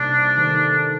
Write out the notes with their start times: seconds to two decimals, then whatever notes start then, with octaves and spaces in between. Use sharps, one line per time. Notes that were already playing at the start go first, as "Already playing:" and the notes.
Already playing: C3 G3 A#3 D4 D#4
0.36 D#3 A3 C4